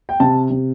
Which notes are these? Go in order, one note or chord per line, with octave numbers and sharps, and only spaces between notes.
G5
C3 A5
C3